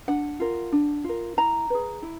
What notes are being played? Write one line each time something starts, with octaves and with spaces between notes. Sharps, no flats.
D4 F#5
F4 A#4
D4
F4 A#4
E4 A#5
G#4 B4
E4